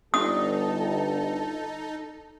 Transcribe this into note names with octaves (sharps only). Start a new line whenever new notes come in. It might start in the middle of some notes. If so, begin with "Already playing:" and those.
G1 D#4 A4 D#6